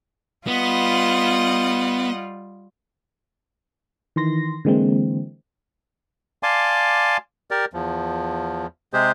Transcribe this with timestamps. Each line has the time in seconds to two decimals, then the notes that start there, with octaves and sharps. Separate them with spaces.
0.47 G3 B3 F4 D#5 F#5
4.16 D#3 E3 C6 A#6
4.65 D3 E3 G#3 A#3 C4
6.43 D5 F5 G#5 A5 C6 D6
7.51 G4 A#4 D5
7.73 E2 F3
8.93 C3 G#3 G4 G#4 C5